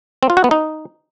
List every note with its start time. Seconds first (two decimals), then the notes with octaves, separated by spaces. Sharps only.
0.23 C4
0.30 F4
0.37 F#4
0.44 B3
0.51 D#4